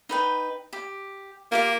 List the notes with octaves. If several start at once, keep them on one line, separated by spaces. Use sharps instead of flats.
D#4 B4 G5
G4
A#3 F4 G4 F5